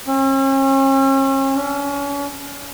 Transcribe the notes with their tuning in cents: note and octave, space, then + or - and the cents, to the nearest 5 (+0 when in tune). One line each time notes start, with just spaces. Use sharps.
C#4 -40
C#4 +35